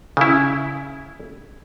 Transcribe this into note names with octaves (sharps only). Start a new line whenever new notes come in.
C#3 E4